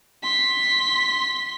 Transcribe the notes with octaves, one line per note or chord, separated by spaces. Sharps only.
C6 B6